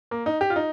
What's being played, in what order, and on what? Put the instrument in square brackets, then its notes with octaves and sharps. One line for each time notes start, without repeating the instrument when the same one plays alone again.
[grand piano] A#3
D#4
G4
F4
D#4